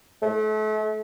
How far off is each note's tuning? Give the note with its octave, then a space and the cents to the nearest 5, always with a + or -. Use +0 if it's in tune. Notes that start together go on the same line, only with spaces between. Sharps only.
A3 -35